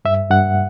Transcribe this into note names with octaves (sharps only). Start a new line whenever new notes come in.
G2 E5
G2 F#5